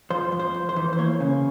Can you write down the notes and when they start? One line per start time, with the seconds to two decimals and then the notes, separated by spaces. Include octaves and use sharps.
0.10 F2 C5
0.32 F2
0.39 C5
0.54 F2
0.69 C5
0.76 E3
0.93 C5
0.98 A#3 C#5
1.20 C#3